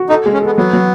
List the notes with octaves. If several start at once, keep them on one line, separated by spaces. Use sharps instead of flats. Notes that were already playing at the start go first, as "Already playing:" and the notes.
Already playing: F#4
D#4 A4
G#3
C#4
B3 A4
F#3 B3
F#3